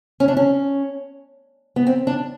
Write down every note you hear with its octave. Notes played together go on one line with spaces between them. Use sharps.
C#4
D4
C#4
B3
C4
D4